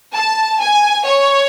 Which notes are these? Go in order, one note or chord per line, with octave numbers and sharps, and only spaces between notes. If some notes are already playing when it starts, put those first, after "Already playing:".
A5
G#5
C#5